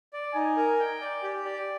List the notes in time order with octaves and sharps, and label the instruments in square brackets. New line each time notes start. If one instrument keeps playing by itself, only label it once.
[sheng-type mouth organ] D5
[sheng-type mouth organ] D#4 [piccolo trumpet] G#5
[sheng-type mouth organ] A#4
G5
D5
G4
D5